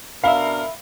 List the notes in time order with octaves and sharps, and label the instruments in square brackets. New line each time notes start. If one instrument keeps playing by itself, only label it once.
[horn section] B2 D4 A#4 [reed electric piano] E5 B5 [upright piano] F5